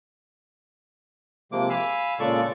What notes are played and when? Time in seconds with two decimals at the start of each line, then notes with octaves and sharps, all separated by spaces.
1.52 C3 F3 G#3 A#3 D6
1.70 F5 G#5 B5 E6
2.20 A#2 C#3 G#3 A4 D5 C#6